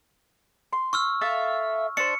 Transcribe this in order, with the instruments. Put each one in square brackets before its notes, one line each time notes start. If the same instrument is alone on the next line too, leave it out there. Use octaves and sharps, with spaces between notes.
[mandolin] C6
[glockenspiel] C#6 E6 F6
[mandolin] A4 E5 F5
[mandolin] D4 C5 [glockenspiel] C#7